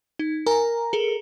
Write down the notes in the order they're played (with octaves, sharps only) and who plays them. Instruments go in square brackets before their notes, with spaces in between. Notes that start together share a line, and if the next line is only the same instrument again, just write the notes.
[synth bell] D#4
[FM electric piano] A#4 A#5 [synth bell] G#5
[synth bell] G#4 A4